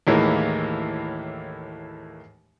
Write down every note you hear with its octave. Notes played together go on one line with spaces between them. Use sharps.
D#2 A2 E3 G#3 A#3